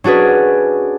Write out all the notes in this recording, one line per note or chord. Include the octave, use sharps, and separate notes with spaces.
C#4 D4 F#4 G#4 B4